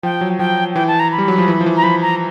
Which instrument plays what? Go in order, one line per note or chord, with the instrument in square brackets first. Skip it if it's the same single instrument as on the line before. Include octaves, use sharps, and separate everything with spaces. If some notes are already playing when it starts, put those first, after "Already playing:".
[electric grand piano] F3 [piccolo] G5
[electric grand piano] F#3
[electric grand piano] F3 [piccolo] G5
[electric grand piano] E3 [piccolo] G5
[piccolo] A5
A#5
B5
[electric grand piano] G3
F#3
F3
E3
F3
E3
[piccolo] A#5
[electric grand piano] F3 [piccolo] B5
[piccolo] A#5